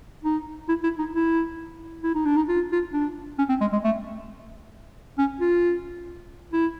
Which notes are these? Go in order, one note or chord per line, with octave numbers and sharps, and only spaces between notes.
D#4
E4
E4
D#4
E4
E4
D#4
D4
D#4
F4
F4
D4
C#4
C4
G#3
G#3
A3
C#4
F4
E4